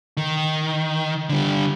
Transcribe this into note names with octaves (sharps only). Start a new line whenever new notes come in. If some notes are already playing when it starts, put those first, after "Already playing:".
D#3
D3 G3